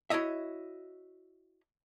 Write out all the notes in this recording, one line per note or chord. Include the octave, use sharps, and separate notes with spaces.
E4 F#4 C#5 D#5 E5